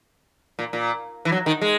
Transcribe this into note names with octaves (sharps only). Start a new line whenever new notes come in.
A#2
A#2
E3
F#3
D#3
G#3